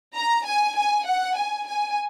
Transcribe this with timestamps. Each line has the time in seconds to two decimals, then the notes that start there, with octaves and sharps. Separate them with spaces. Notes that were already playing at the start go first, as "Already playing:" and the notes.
0.15 A#5
0.45 G#5
0.76 G#5
1.06 F#5
1.36 G#5
1.67 G#5